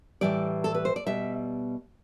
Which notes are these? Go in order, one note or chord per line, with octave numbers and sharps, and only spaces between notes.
A2 E3 G3 D5
A4
B4
C5
D5
B2 G3 E5